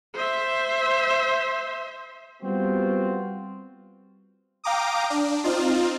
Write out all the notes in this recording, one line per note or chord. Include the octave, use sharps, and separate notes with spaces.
C5 E5
G3 B3 C4 F4 F#4
F5 G5 A#5 D6 D#6
D4
C4 D#4 F4